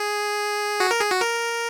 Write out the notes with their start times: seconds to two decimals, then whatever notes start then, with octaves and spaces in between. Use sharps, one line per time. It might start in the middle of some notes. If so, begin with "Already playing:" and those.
Already playing: G#4
0.80 F#4
0.91 A#4
1.00 G#4
1.11 F#4
1.21 A#4